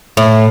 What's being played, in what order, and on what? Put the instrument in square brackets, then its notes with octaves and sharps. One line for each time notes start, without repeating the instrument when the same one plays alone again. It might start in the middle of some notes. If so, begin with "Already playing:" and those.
[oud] A2